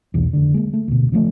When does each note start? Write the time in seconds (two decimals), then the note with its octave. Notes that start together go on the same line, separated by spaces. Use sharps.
0.14 D#1 B1 E2
0.33 F1 D3
0.54 G#3 A#3
0.73 A3
0.88 D2 B2
1.12 C#3 F3 G3 A3